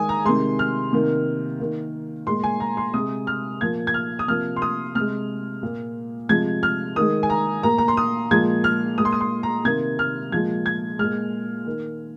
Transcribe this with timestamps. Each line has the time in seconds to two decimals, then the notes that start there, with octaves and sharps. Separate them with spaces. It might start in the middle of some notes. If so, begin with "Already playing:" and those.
Already playing: D#3 G#3 G#5 D#6
0.09 A#5
0.25 C3 D#3 G#3 C6
0.59 F6
0.93 C3 D#3 A#3
1.60 D#3 A#3
2.27 A#2 G#3 C6
2.43 G#5
2.60 A#5
2.77 C6
2.94 C3 G#3 D#6
3.27 F6
3.61 A#2 F3 A#3 G#6
3.87 G#6
3.94 F6
4.19 D#6
4.28 C3 F3 A#3 F6
4.56 C6
4.62 D#6
4.95 C3 G#3 F6
5.63 A#2 A#3
6.29 C3 F3 G#3 G#6
6.63 F6
6.96 D#3 G#3 D#6
7.23 G#5
7.30 A#5
7.63 A#2 A#3 A#5
7.78 A#5
7.88 C6
7.97 D#6
8.31 A#2 F3 G#3 G#6
8.64 F6
8.98 A#2 G#3 D#6
9.05 C6
9.12 D#6
9.21 C6
9.43 A#5
9.65 C3 D#3 A#3 G#6
9.99 F6
10.32 A#2 F3 G#3 G#6
10.66 G#6
10.99 A#2 G#3 F6
11.66 D#3 A#3